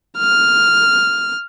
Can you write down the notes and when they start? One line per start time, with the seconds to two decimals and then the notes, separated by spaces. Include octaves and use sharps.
0.18 F6